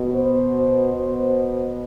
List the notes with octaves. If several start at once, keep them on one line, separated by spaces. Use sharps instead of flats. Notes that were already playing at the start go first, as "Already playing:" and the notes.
Already playing: B2
C5
B2